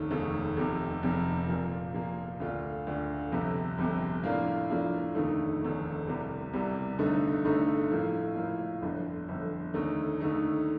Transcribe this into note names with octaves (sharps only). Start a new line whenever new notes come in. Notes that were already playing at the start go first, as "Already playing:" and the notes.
Already playing: F1 D#2 D#3 A3 D#4
F1 D#2 D#3 A3 D#4
F1 F2 C3
F1 F2 C3
A#2 F3 A#3
A#2 F3 A#3
D2 D3 A3 D4 F4
D2 D3 A3 D4 F4
G1 F2 C3
G1 F2 C3
A2 F3 A#3 D4 F4
A2 F3 A#3 D4 F4
F1 D#2 D3 A3 D#4
F1 D#2 D3 A3 D#4
C2 C3 G3
C2 C3 G3
G1 G2 D3 A3 D#4
G1 G2 D3 A3 D#4
A2 F3 A#3
A2 F3 A#3
G1 F2 D3
G1 F2 D3
D#2 D3 A3 D#4
D#2 D3 A3 D#4